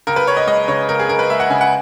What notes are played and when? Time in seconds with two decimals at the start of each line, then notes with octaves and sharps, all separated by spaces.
0.07 C#2 A#4
0.16 B4
0.27 C#2 C#5
0.37 D#5
0.47 G#3 D#5
0.68 C#3 C#5
0.88 C#2 A#4
0.99 G#4
1.09 C#2 A#4
1.19 B4
1.30 G#3 E5
1.40 F#5
1.50 C#3 G#5
1.61 F#5